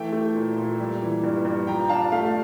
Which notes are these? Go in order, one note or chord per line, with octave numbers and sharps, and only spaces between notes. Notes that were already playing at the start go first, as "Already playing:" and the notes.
Already playing: E3 A3 E5 G5
A3
A#2
A#2
G3
E3
G2
G2
F3 G5 A#5
D4 F5 A5
A3 F5